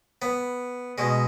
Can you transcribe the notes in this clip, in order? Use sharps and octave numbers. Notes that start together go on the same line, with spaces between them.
B3
B2 G#3